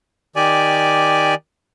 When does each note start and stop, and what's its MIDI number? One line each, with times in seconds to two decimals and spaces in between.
0.36 1.35 51
0.36 1.35 67
0.36 1.35 74
0.36 1.35 80